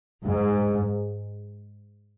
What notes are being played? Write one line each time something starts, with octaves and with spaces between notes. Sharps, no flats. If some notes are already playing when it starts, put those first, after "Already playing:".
G#2